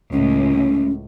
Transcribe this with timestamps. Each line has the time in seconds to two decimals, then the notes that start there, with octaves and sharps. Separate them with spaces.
0.12 C#2 A2 C#4